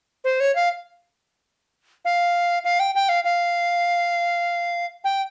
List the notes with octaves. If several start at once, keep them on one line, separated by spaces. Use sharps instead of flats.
C5
C#5
F5
F5
F5
G5
G5
F5
F5
G5